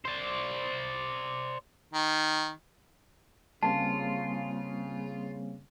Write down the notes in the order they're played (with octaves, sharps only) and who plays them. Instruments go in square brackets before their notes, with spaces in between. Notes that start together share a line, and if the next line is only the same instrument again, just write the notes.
[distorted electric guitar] C5 D5
[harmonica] D#3
[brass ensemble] C#3 [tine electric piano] G3 A#3 C4 [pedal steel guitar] F4 [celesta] A5